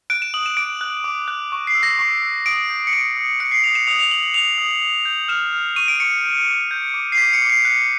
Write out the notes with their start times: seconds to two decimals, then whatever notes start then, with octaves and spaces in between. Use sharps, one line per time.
0.10 F#6 D7
0.22 E7
0.34 D#6 F#7
0.46 E7
0.57 D6 D7
0.81 F#6
1.04 D6
1.28 F#6
1.52 C#6
1.67 C7
1.75 E6
1.83 A#6
1.99 C#6 C7
2.22 E6
2.46 D#6 D7
2.70 G6
2.87 C#7
2.93 D#6 D7
3.17 D#6
3.40 F#6 C#7
3.52 C7
3.64 D#6 F7
3.75 E7
3.87 D#6 F7
3.99 F7
4.11 D#6 F#7
4.23 F#7
4.34 D#6 F7
4.58 D#6
4.82 D#6
5.05 G6
5.28 F6 E7
5.53 F6
5.76 C#6 D#7
5.88 D7
6.00 C#6 C#7
6.23 G6
6.47 D6
6.71 G6
6.94 D6
7.12 C7
7.18 D6 B6
7.33 C#7
7.41 D6
7.50 C7
7.65 F#6